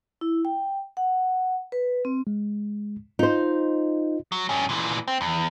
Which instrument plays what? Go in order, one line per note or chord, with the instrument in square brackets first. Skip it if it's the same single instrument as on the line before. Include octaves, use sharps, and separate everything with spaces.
[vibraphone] E4
G5
F#5
B4
C4
[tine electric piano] G#3
[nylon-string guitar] D#4 C5 [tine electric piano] F4
[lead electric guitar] F#3
G2 C#4
A#2 E3
C4
E2